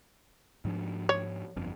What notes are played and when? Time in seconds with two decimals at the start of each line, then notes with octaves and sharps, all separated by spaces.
0.65 G#2 F3 D4
1.09 C#5
1.56 G1 F2